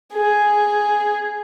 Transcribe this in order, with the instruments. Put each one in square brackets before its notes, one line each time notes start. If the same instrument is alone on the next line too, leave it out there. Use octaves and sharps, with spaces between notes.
[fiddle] G#4